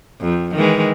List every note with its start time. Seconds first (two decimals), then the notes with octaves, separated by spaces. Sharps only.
0.21 F2
0.55 D#3 E3 G#3